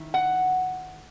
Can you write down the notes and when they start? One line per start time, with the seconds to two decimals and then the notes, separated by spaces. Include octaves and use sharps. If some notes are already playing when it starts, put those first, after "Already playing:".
Already playing: D#3 E4
0.14 F#5